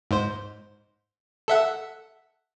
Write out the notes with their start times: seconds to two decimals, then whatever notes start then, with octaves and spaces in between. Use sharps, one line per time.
0.11 G#2 C5
1.48 A4 E5 F#5